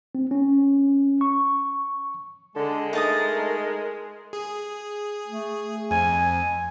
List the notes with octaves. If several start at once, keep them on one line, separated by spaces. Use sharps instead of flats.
C4
C#4
C#6
D3 G#3 A4
A3 D#4 A#4 A5 D#6
G#4
A3
F2 G#5
G#5